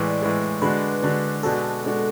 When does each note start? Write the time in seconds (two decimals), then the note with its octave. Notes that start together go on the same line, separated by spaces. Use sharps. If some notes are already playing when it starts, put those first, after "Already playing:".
Already playing: A2 E3 G#3 D5
0.22 A2 E3 G#3
0.62 D3 G#3 D4 F#4 B4
1.02 D3 G#3 D4 F#4
1.43 B2 G#3 D4 F#4 A4
1.84 B2 G#3 D4 F#4